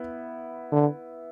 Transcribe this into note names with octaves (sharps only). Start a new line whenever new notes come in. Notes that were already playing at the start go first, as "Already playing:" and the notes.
Already playing: B3 E4
D3